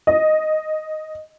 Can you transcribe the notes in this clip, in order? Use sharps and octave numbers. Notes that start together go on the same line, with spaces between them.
D#5